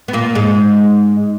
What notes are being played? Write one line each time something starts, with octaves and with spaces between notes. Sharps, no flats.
B3
A#2 A#3
G#2 G#3